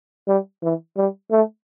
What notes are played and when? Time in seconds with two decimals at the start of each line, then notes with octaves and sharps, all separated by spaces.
0.28 G3
0.63 E3
0.97 G3
1.31 A3